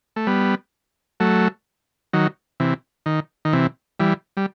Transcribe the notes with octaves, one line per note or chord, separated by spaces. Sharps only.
A3
G3 B3
F#3 A3
D#3 F#3
C3 E3
D#3
D#3
C3 E3
E3 G3
G3